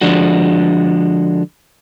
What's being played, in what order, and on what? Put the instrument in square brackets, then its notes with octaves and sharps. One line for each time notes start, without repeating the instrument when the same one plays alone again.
[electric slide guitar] D3 F3 G#3 D4 F#4